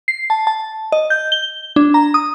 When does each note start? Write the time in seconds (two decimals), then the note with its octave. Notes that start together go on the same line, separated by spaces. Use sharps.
0.08 C7
0.30 A5
0.47 A5
0.92 D#5
1.10 G6
1.32 G7
1.76 D4
1.94 A#5
2.14 D#6